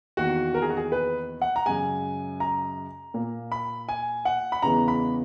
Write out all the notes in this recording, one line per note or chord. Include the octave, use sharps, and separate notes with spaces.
E2 D#3 A#3 F#4
A#4
G#4
F#4
G#4
B4
F#5
A#5
F#2 C#3 G#3 G#5
A#5
A#2 A#3
B5
G#5
F#5
B5
E2 C#3 E3 G#3 B3 A#5
B5